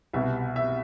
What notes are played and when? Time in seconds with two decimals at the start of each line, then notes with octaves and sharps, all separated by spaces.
0.14 C2 B2 G3 E5
0.56 E5